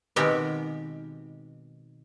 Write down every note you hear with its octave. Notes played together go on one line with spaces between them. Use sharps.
B2 D#3 G#3 B3 C4 G4